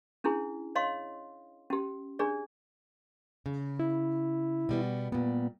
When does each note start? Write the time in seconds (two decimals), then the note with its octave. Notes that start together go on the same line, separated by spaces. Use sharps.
0.24 C#4 D4 E4 G#4
0.75 C#5 D#5 F5 C6
1.70 C#4 G4
2.19 D4 G#4 D5
3.46 C#3
3.79 E4
4.69 B2 G3 B3
5.12 A#2 G3 B3